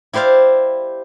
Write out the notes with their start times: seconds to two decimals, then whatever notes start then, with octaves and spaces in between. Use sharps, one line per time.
0.13 E4 G4 C5 D5 F5